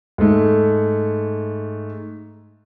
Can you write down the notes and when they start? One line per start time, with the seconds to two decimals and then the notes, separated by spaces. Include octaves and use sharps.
0.18 G#2 A3